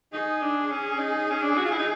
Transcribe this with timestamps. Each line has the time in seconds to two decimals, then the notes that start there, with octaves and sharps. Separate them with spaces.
0.13 D#4 G#4
0.42 D4
0.71 C#4
0.99 D#4
1.31 C#4
1.42 D4
1.57 F#4
1.65 F4
1.72 E4
1.79 D#4